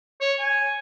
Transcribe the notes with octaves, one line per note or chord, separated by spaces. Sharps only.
C#5
G#5